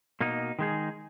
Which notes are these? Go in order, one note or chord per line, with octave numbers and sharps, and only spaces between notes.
B2 A#3 D#4
D#3 G#3 D#4 G#4